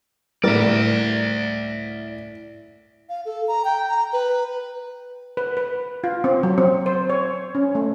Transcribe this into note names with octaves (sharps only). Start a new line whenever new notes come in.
A2 G3 A#4 D5 E5
F5
A4
A#5
G5
A#5
B4
B4
B4
F4
C4
F#3
C4
C5
C#5
C#4
A3